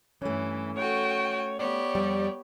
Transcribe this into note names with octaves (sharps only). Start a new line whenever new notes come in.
G2 E3 A3 C#4
F#4 A4 C#5 G5
B3 G4 C#5 D5
F2 G3